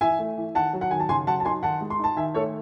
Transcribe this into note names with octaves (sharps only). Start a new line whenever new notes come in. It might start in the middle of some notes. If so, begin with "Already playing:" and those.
E3 E5 G#5
A3
E3
D#3 F#5 A5
F#3
F#5
D#3 G#5
A5
C#3 G#5 C6
F#3 F#5 A5
A5
D#4 G#5 C6
D#3 F#5 A5
G#3
C6
D#4 A5
D#3 E5 G#5
A3 A4 C#5